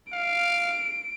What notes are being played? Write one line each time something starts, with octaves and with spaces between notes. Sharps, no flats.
F5 D7